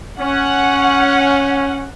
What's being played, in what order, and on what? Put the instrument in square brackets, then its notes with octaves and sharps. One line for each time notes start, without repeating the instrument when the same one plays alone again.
[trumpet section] C#4 [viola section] F#5